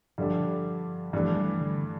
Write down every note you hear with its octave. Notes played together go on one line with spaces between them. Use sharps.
G2 D3 F3 G3 D4 A4
G2 E3 F3 A3 D4 A4
G3
D3